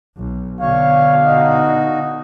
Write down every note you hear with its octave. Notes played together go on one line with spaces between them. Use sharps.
B1
B2 D3 C#5 F5
D#4 F#4